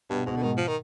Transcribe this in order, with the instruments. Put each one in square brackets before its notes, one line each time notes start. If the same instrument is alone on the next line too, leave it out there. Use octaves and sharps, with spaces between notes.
[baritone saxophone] G2 [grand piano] B2
[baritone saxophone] G#2 [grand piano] B2
[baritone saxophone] D3
[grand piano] G#2 [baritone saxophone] D#3
[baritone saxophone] F3
D#3